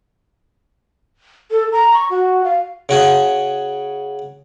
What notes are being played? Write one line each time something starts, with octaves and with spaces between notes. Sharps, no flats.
A4
A#5
C#6
F#4
F5
C#3 F#4 G#4